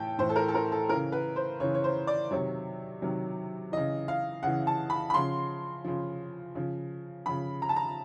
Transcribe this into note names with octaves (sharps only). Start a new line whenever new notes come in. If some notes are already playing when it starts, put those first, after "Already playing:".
Already playing: A2 E3 G5 A5
A2 E3 C5
A4
A#4
A4
A#4
A4
C#3 E3 A#4
B4
C5
C#3 E3 C#5
C#5
C5
D5
C3 D#3 F#3 C#5
C3 D#3 F#3
C#3 E3 D#5
F5
C#3 E3 F#5
A5
B5
B5
C#3 F3 C6
C#3 F3
C#3 F3
C#3 F3 B5
A#5
A5
A#5